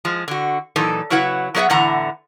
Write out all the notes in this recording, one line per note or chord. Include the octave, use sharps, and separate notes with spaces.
F3 G#3
D3 F#4
A#2 E3 F#3 D#4 A4
C#3 F#3 E4 B4 F#5
F#3 B3 G#4 C#5 E5 F#5
E2 A2 D3 E3 F#5 A#5